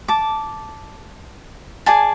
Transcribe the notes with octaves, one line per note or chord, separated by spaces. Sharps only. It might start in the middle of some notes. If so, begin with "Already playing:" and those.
A5 D6
G#4 D5 G#5 A5